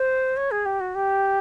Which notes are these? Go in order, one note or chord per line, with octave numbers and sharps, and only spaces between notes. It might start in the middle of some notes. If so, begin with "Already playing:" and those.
Already playing: C5
C#5
G#4
G4
F#4
G4